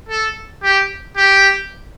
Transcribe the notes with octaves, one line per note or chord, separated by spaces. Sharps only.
A4
G4
G4